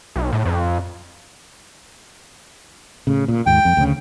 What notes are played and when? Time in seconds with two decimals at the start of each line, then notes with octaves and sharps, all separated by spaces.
0.16 B1
0.33 A2
0.46 F2
3.07 A2 C#3
3.28 A#2
3.46 D#2 G#2 G5
3.65 F2
3.77 D2 C#3